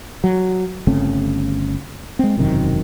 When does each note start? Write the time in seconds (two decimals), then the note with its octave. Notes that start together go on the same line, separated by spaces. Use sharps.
0.24 F#3
0.87 G1 C#3 A3 C4
2.19 G#3 C4
2.38 E1 F#2 C3 D#3